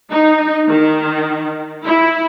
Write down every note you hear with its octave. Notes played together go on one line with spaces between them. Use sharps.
D#4
D#3
E4